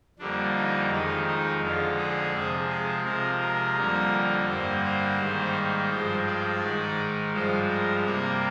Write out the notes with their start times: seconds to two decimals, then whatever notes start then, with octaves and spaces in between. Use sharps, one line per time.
0.19 F2 D3 G3 A#3 D4
0.55 D#4
0.91 F2 D#3 G#3 D#4
1.27 D#4
1.62 F2 D3 G#3 F4
1.98 G#4
2.34 C3 F3 G#3
2.69 G#4
3.04 C3 F3 G#3 A#4
3.40 A#4
3.77 F2 D3 G3 A#3
4.48 G2 D3 G3 A#3 C5
4.83 C5
5.19 G#2 D#3 G3 A#3
5.91 G2 F3 G#3 C5
6.27 D5
6.62 G#2 D#3 G#3
7.33 G2 F3 G#3 C5
7.69 A#4
8.05 C3 G3 A#3 A#4